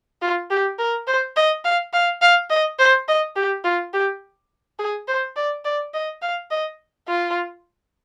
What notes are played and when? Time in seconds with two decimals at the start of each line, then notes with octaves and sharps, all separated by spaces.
0.22 F4
0.50 G4
0.79 A#4
1.07 C5
1.36 D#5
1.65 F5
1.93 F5
2.22 F5
2.50 D#5
2.79 C5
3.08 D#5
3.36 G4
3.65 F4
3.93 G4
4.79 G#4
5.08 C5
5.36 D5
5.65 D5
5.93 D#5
6.22 F5
6.51 D#5
7.08 F4